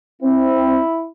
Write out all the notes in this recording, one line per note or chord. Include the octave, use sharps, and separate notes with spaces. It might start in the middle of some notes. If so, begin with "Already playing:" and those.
C4 E4